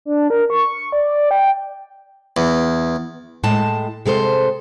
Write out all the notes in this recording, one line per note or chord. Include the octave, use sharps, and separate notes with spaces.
D4
A#4
C#6
D5
G5
E2
A2 G#3 A5
C3 G#3 A4 C5